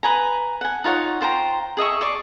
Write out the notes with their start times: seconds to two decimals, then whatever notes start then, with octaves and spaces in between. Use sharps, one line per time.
0.03 B4 G#5 A#5
0.61 F#5 G#5
0.84 D#4 F4 C#5 F#5
1.21 F4 C5 G5 A#5
1.77 G#4 D#5 E5 C#6
2.01 G#4 D5 C#6